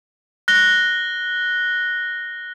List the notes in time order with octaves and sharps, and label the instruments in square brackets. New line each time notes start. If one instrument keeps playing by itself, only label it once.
[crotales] F#6 A#6 G7